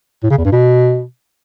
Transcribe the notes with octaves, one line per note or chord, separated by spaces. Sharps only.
A2
C#3
E2
G2
B2